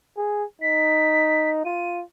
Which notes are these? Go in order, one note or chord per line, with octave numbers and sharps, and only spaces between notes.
G#4
D#4 B6
F4 D#7